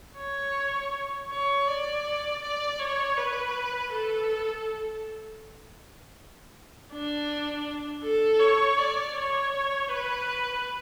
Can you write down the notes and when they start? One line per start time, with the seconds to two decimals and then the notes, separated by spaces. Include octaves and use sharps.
0.17 C#5
1.30 C#5
1.68 D5
2.43 D5
2.79 C#5
3.17 B4
3.92 A4
6.91 D4
8.04 A4
8.40 C#5
8.78 D5
9.15 C#5
9.89 B4